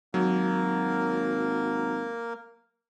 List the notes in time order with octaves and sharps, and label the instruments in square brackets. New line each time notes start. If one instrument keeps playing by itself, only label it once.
[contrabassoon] G#1 [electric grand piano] F#3 [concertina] A#3 A#4